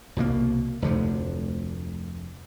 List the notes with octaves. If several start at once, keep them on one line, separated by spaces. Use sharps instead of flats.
C2 B2 F#3 A#3
F1 D2 D3 F3